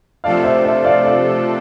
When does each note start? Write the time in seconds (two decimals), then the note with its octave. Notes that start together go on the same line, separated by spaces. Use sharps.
0.24 C3 F3 A3 D4 A4 D5 F5
0.44 C5 E5
0.64 C5 E5
0.85 D5 F5
1.05 D5 F5